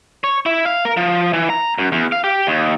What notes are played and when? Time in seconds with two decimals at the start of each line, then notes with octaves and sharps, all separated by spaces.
0.24 C#5
0.46 E4
0.65 F5
0.85 A#4
0.97 F3
1.33 E3
1.50 A#5
1.78 F#2
1.92 E2
2.12 F5
2.24 G4
2.47 D#2